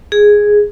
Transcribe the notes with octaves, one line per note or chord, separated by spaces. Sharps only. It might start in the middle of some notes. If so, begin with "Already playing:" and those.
G#4